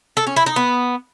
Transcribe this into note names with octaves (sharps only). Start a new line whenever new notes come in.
A4
C#4
E4
D#4
B3